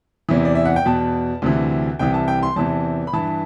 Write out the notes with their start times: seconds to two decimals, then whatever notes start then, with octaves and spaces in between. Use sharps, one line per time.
0.29 E2 C3 E3
0.45 D5
0.55 E5
0.65 F#5
0.76 G5
0.85 E2 B2 A5
1.42 D2 C3 E3
1.99 C2 C3 E3 G5
2.14 A5
2.28 G5
2.43 C6
2.56 E2 C3 E3 A5
3.07 B5
3.13 G2 E3 A5